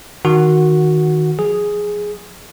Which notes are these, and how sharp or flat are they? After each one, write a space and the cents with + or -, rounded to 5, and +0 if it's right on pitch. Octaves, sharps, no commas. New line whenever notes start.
D#3 +0 F#4 -10 F#5 +0
F3 +40 G#4 +0